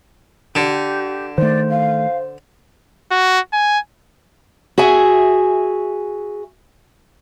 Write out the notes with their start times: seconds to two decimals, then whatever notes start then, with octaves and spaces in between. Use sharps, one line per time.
0.55 D3 G4
1.38 D#3 A3 C5 D5
1.70 F5
3.11 F#4
3.53 G#5
4.78 F#4 G#4 E5 G#5